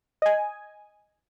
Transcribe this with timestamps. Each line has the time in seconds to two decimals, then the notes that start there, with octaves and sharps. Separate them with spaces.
0.22 D#5 G#5